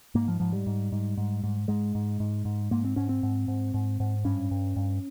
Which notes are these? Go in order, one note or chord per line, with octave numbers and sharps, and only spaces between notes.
G#2 A#3
F3
G#2 F3
G3
G#2
G#2
G#2
G#2
G#2 G#3
G#2
G#2
G#2
G#2 A#3
C4
G#2 C#4
C4
G#2
G#2
G#2
G#2
G2 C#4
G2
G2